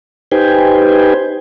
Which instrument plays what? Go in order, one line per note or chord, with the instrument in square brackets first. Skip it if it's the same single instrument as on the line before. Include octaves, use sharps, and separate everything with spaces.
[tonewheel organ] D#4 G4 B4 C5 G5 G#5